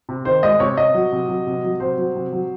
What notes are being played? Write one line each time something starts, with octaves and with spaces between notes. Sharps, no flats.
C3
D#3 C5
G#3 D#5
C3 C#5
C3 D#5
F#3
C3
F#3
C3
F#3
C3 C5
F#3
C3
F#3